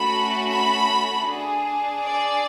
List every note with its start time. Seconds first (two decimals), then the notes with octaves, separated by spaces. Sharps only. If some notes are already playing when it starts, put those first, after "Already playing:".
Already playing: A3 C#4 F#4 A4 B5
0.49 B5
1.26 D4 G#4
2.02 D5